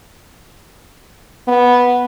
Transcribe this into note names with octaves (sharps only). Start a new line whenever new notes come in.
B3